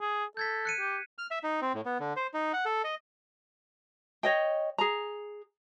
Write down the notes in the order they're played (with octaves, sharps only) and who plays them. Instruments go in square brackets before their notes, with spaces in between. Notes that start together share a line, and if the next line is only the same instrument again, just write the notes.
[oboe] G#4
[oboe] A4 [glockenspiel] G6 G#6 B6
[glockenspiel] F#6 C#7 D#7
[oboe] G4
[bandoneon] F6
E5
D#4
C4
A2
B3
D3
C5
D#4
F#5
A4
D#5
[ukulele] C#5 D#5 G5
G#4 A#5